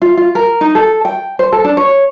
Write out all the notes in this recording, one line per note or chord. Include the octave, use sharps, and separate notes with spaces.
F4
F4
A#4
D#4
A4
G5
C5
A4
D4
C#5